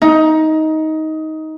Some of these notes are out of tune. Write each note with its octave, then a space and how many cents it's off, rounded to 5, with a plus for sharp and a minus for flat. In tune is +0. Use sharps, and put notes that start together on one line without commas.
D#4 +15